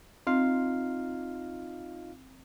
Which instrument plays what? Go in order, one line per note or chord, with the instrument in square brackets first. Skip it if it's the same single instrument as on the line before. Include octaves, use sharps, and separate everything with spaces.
[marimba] C4 [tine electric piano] D#4 F4 F5